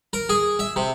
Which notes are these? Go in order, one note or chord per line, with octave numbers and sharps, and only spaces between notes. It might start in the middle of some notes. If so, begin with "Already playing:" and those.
A#4
G#4
E5
C3